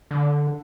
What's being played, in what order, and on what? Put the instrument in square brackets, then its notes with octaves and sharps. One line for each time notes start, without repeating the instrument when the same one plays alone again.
[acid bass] D3